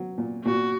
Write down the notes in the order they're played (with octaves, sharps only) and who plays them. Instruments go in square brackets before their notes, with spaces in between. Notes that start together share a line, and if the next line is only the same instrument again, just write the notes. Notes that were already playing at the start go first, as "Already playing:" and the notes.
Already playing: [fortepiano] F#3
A#2
[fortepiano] A#2 [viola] F#4